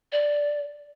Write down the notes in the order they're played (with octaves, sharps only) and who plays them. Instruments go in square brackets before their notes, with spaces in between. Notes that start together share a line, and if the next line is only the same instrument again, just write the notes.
[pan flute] D5